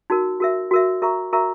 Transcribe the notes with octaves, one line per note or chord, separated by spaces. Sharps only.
D#4 F#4 A#4
F#4 A#4 E5
F#4 A#4 E5
F#4 A#4 E5 A#5 C#6
F#4 A#4 E5 A#5 C#6